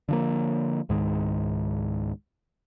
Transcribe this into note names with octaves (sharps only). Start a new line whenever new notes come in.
D3 F3 A#3
C#2 G#2 D#3 G#3